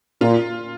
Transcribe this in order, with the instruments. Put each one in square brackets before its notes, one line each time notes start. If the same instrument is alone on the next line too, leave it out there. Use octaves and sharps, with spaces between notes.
[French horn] A#2 [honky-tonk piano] F4